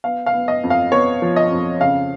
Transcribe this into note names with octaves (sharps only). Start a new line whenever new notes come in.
B3 F5
F5
B3
D#5
F2
F5
B3 C#5
F3
D#5
F2
C#3 F5